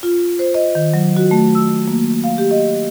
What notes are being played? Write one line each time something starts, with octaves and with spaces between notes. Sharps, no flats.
F4
C5
D#5
D#3
F#3
F#4
A3
E6
A#3
F5
G4
D#5